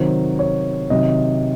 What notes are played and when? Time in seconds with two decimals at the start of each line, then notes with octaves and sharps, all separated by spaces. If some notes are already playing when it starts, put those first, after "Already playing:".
Already playing: C3 D#3 F#3 C5
0.39 C#5
0.90 C3 D#3 F#3 D#5